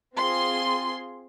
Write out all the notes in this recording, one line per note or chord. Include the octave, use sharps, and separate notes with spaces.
C4 F4 G#4 C6